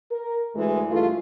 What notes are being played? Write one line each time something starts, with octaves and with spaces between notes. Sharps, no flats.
A#4
D2 E3 G#3
G2 E3 G#3 A3 F4